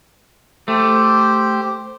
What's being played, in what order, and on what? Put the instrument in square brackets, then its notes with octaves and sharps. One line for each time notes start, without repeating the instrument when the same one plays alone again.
[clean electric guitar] A3 [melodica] G4 C5